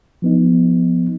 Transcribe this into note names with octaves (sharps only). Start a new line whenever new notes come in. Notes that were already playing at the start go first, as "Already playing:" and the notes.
F3 B3 D#4